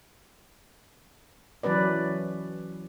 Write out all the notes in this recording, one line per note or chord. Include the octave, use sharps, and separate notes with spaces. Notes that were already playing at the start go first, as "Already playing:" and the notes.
E3 F#3 C#4 B4 D5